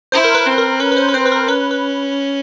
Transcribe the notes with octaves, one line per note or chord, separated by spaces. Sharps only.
E4 C5
A#4
B4
C4
A#4
C#4 B4
B4
C5
B4
C4 C5
B4
A#4
C#4 B4
B4